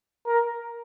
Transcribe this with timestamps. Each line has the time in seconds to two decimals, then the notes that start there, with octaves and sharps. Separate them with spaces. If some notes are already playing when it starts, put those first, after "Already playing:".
0.26 A#4